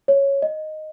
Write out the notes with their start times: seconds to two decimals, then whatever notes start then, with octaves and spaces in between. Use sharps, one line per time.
0.08 C#5
0.42 D#5